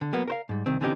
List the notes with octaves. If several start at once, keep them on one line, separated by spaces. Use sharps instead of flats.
D3
F#3 A#3 B3
A#4 C5 F5
G#2 G3
C2 D#3 C4
D3 E3 C4 C#4 D#4 G4